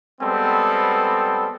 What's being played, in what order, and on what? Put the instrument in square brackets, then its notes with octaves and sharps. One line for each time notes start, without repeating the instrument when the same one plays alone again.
[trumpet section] G3 G#3 B3 C4 A4